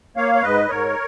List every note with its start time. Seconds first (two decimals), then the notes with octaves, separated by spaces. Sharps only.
0.17 A#3 C#5 F5
0.35 C#5
0.42 G#2 B4 D#5
0.69 G#2 A#4 C#5